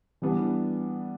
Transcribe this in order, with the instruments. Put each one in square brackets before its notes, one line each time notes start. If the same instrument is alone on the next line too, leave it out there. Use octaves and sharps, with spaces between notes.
[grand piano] E3 G3 B3 D4